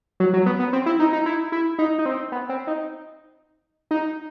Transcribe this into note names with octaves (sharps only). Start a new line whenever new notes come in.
F#3
F#3
B3
B3
C4
E4
D#4
D#4
E4
E4
D#4
D#4
C4
B3
C4
D#4
D#4